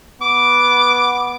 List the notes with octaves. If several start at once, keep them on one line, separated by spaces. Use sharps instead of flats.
B3 D6